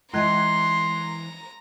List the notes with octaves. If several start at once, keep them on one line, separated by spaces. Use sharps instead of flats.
E3 G#3 D#5 A#5 C6 F#6 G#6